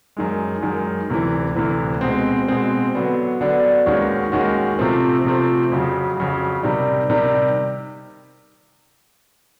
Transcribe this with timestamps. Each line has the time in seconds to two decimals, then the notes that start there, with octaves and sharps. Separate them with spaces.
0.17 F#2 D#3 G#3
0.63 F#2 D#3 G#3
1.10 D2 C3 E3
1.56 D2 C3 E3
2.01 B2 G#3 C4
2.48 B2 G#3 C4
2.95 D3 F#3 B3 D4
3.41 D3 F#3 B3 D4
3.86 D#2 D#3 G#3 C#4 F#4
4.32 D#2 D#3 G#3 C#4 F#4
4.79 C3 F3 A3 C4
5.25 C3 F3 A3 C4
5.72 F2 C#3 F#3
6.17 F2 C#3 F#3
6.63 C3 D#3 G3
7.10 C3 D#3 G3